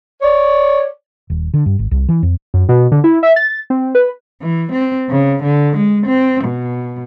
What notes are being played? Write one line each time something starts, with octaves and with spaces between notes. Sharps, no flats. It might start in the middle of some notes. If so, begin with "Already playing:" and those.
C#5 D5
D#1
D3
G2
G#1
C2
E3
F2
F#2
B2
D3
E4
E5
A6
C4
B4
E3
C4
C#3
D3
G#3
C4
B2